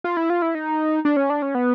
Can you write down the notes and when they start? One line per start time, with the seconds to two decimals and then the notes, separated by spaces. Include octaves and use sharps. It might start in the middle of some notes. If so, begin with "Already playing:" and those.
0.04 F4
0.17 E4
0.30 F4
0.42 E4
0.55 D#4
1.05 D4
1.17 C#4
1.30 D4
1.42 C#4
1.55 B3